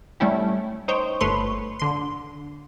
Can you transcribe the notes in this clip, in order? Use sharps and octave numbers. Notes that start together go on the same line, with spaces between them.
G3 A3 C#4 E4 G4
D#4 C5 C#5 G5
G1 A3 B4 C#5 C6
D3 C6